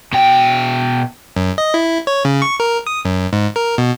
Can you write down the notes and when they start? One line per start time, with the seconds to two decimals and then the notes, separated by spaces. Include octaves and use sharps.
0.13 B2 G5
1.36 F#2
1.58 D#5
1.74 E4
2.07 C#5
2.25 C#3
2.42 C#6
2.60 A#4
2.87 D#6
3.05 F#2
3.33 G#2
3.56 A#4
3.78 B2